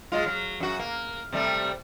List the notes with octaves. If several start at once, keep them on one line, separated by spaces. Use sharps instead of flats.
F#3 G#3 F4
F#3
F#2 F#4
A#3
C3 G3 A3